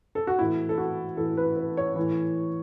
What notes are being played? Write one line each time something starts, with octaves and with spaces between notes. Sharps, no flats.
A4
F#4
A2 E3 E4
A4
F#4
A2 E3 A4
B4
B4
C#5
A2 E3